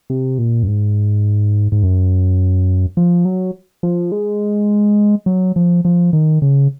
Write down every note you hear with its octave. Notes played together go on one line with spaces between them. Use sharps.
C3
A#2
F#2
G#2
G#2
F#2
F3
F#3
F3
G#3
F#3
F3
F3
D#3
C#3